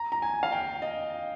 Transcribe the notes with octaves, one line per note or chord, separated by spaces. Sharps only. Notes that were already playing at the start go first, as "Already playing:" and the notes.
Already playing: A#5
A#5
G#5
F5
G5
D#5